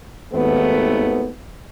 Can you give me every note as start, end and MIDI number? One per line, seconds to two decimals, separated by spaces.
0.33 1.28 32
0.33 1.28 39
0.33 1.28 57
0.33 1.28 59